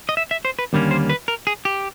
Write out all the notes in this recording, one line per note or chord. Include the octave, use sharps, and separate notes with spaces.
D#5
E5
E5
C5
B4
D#2 D3 G3 A#3 C#4
C5
B4
A#4
G#4
G4